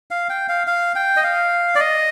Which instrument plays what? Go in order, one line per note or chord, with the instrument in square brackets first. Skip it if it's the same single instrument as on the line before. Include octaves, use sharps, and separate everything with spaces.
[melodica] F5
G5
F5
F5
G5
D#5
F5
D5
D#5